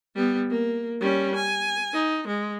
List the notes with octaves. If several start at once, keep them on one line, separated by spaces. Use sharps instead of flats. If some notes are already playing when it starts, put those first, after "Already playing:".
G3 B3
A#3
G3 C#4
G#5
D#4
G#3